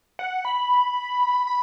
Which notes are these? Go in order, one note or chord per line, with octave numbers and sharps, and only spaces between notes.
F#5
B5
B5